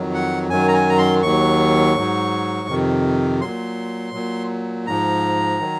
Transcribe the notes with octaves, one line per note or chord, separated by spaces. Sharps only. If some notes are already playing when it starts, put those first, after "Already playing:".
Already playing: F2 D#3 F#3
F#5
F#2 D#3 F#3 G#5
A#5
G#5
A#5
C6
D#2 D#3 F#3 C#6
G#2 F#3
F2 C3 D#3
A#2 F#3 C6
A#2 F#3
G#2 F3 A#5
D#3 F#3